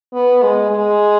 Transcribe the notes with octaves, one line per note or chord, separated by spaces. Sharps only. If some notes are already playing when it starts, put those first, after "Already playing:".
B3
G#3
G#3